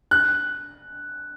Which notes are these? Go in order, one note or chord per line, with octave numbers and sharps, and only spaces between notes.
F#6